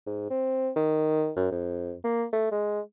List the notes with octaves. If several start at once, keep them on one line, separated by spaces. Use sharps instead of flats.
G#2
C4
D#3
F#2
F2
A#3
A3
G#3